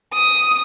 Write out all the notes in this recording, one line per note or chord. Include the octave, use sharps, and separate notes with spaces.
D#6